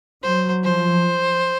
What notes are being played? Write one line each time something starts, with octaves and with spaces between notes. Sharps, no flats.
F#3 C5
F3 C5